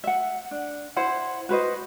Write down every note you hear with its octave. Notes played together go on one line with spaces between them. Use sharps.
E5 F#5
D4
E4 C5 F#5
F#4 B4 C5 D#5